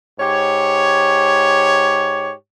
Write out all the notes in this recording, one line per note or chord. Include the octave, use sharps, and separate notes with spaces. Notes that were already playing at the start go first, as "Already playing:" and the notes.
G#2 G4 C#5